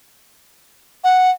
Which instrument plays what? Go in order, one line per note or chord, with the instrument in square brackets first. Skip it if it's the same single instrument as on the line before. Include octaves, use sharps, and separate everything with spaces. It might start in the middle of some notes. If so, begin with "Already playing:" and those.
[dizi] F#5